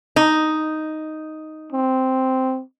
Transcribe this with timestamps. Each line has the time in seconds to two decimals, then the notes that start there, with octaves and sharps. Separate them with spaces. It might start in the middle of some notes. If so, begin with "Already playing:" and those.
0.16 D#4
1.72 C4